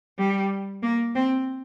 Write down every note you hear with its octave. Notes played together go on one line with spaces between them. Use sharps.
G3
A#3
C4